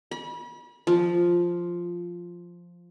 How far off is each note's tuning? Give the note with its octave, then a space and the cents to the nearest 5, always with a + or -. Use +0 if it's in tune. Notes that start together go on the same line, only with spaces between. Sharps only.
B5 -35
F3 +0